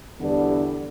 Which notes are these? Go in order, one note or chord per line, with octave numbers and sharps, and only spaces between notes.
E2 D3 G3 B3 D4